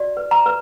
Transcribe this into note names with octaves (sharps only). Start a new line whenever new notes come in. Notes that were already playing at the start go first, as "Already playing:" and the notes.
Already playing: F#4 D5
B4
A#5
B4